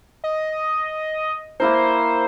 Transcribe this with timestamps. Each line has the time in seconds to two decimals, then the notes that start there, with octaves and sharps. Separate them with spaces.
0.24 D#5
1.60 A#3 E4 A#4 C5